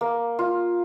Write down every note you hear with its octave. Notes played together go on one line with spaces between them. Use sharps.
A#3
F4